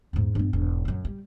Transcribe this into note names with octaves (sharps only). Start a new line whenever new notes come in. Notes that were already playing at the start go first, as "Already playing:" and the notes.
E2 G#2
G2 B3
E1 G#2
F#2 F#3
G3